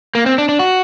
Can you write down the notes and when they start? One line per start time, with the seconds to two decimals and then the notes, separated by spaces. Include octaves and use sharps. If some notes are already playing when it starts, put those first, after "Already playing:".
0.15 A#3
0.26 C4
0.38 D4
0.49 D4
0.59 F#4